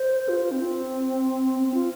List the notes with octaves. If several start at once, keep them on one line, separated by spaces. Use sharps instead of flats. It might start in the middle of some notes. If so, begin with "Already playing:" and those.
Already playing: C5
F4
C4
C4
F4